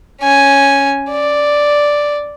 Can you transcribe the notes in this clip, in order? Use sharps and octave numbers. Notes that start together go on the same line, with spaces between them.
C#4 G#5
D5